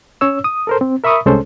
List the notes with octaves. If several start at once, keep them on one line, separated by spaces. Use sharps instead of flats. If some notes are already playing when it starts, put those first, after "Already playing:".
C#4 C#5 E6
D#6
A4 A#4 C5
C4
A#4 E5 B5 C#6 D#6
C2 G#3 C#4 A4 C5